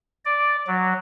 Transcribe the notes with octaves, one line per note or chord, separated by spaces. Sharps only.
D5
F#3